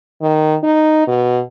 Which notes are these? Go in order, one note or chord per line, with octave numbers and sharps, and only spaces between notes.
D#3
D#4
B2